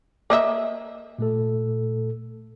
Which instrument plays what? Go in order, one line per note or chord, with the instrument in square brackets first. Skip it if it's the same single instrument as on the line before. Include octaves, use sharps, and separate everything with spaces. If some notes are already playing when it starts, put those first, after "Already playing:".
[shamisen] A#3 D#5 E5
[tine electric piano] A#2 A3 A4